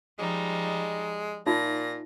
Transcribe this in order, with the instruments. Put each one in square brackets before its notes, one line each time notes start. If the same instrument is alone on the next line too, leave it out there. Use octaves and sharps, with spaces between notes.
[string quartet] F3 G3 D#4 [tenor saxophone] G#3
[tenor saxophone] A#2 [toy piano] D#4 F4 E5 [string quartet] A#6